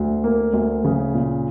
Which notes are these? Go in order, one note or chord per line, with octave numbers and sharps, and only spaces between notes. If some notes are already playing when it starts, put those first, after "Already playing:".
Already playing: D2
A#3
D2
C#3
A#2